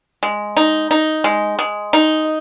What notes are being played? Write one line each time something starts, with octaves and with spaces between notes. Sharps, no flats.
G#3
D#4
D#4
G#3
G#3
D#4